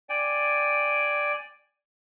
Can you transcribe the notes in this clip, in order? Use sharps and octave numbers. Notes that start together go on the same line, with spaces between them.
D5 G5 G#5